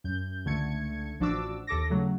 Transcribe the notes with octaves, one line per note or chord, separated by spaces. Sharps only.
F#2 G6
C#2 D3 A3 G#6 C#7
A1 F3 D4 F#4 D6 E6
D#2 A4 D6 A#6
C#3 F#3 A3